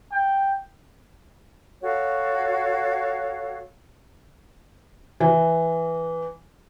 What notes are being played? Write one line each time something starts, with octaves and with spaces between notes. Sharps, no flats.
G5
F#4 A4 C#5 F5
E3